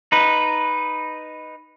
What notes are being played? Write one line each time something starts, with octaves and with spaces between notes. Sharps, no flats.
D#4 B4